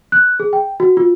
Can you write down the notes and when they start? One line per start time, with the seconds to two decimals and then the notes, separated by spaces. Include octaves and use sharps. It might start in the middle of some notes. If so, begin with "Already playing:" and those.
0.12 F#6
0.40 G#4
0.53 G5
0.80 F#4
0.97 F4